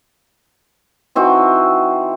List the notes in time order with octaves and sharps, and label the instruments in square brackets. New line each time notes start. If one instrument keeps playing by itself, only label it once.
[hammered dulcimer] E3 C4 D#4 F#4